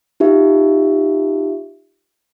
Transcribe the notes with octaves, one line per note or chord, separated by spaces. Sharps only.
D#4 F4 G4 E5